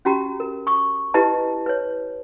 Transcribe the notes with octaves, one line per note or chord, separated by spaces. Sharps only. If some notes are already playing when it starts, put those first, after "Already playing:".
C#4 F#4 G4 A#5
A#4
C#6 D#6
E4 G4 B4 D#5 A5 A#5
B4 C#5